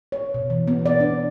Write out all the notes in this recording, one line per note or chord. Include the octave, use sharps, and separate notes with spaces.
C#5
B2
E3
B3
D5
D4